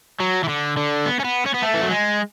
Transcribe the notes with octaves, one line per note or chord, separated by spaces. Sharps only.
F#3
E3
D3
D3
B3
C#4
B3
C#4
B3
A3
E3
F#3
G#3